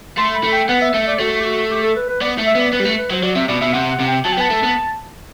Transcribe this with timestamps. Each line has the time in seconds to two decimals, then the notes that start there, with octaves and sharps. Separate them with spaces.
0.18 A3 C6
0.35 B5
0.44 A3
0.52 G5
0.68 B3 F#5
0.82 E5
0.94 A3 E5
1.07 D5
1.19 A3 F#4
1.41 G4
1.45 F#4
1.71 G4
1.83 A4
1.96 B4
2.09 B4
2.21 B3 D5
2.38 A3
2.47 E5
2.55 B3 D5
2.72 B3 B4
2.80 G3
2.85 A3
2.98 B4
3.10 F#3 C5
3.23 F#3 D5
3.36 C3 E5
3.48 B2 D5
3.61 B2 E5
3.73 C3 F#5
3.91 F#5
4.00 C3
4.07 G5
4.25 F#3 A5
4.33 G5
4.37 B3 A5
4.50 A3
4.63 B3